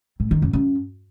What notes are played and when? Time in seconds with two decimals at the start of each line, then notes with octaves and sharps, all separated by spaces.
0.20 A2
0.31 D#3
0.42 F#2
0.53 F#2